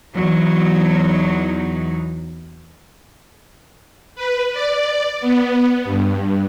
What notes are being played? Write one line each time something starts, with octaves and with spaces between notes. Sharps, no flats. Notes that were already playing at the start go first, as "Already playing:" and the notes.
E2 F#3 D#4
B4
D5
B3
G2